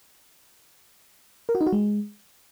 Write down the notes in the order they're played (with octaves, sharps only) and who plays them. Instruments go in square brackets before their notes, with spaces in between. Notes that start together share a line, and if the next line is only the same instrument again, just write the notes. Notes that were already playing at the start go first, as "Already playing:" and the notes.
[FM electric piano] A#4
F#4
D#4
F#4
G#3